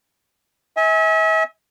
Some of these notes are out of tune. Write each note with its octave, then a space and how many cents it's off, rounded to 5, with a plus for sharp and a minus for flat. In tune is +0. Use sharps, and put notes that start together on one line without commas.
E5 -40 G#5 +0